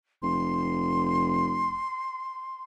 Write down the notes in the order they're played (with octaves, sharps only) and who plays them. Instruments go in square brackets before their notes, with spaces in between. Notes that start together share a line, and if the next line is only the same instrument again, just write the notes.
[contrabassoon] F1 [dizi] C6